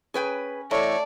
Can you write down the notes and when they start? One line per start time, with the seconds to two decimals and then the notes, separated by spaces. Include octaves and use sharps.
0.14 C#4 G#4 B4 G5
0.71 A2 E3 A3 C#5 D5